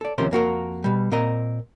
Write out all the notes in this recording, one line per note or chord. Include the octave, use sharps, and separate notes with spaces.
A4 D5
D#2 C3 F3 C#4 A#4 C5
F2 A#3 F#4 A#4
B2 G3
A#2 C4 A#4 D#5 A#5